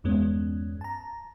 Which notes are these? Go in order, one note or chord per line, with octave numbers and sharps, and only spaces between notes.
E2 G2 G#3 B3 C#4
A5 A#5